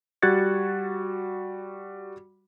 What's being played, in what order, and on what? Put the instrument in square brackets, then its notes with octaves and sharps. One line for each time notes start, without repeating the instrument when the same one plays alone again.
[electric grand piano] G3 F#4 F#6 G#6 A6 C#7